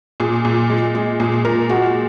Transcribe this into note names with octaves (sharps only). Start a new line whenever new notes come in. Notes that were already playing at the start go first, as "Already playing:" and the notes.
A#2 G#4
A#2
G#3
G#3
A#2 G#4
A#2 A#4
G#3 F#4